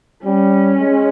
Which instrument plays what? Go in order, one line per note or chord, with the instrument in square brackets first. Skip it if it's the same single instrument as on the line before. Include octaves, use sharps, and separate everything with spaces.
[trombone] G3 [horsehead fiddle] C#4
[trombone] G#3